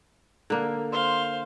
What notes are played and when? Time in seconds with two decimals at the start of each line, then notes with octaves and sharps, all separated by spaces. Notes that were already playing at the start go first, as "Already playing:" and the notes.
0.50 D3 A#3
0.92 C5 F5 C6